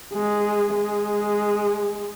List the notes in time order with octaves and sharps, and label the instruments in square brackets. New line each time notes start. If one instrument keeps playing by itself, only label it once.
[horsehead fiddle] G#3
G#3